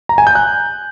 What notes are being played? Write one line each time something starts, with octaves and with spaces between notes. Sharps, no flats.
A#5
G#5
G6
F#6